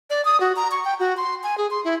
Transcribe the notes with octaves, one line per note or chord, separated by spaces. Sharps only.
D5
D#6
F#4
A#5
C#6
G5
F#4
C6
G#5
G#4
C6
E4